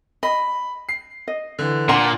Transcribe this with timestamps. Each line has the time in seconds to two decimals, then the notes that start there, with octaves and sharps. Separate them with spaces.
0.23 D#5 B5
0.89 C7
1.28 D#5
1.59 D3 E3
1.89 A#2 D4 F#5 A#5 C6